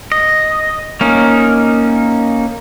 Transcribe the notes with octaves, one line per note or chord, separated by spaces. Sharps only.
D#5
A#3 C#4 D#4